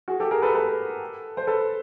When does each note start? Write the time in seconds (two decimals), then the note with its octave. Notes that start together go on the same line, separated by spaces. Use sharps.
0.08 F#4 G#4
0.20 G4 A4
0.31 G#4 A#4
0.42 A4 B4
0.55 A4 B4
1.37 C5
1.47 A4 B4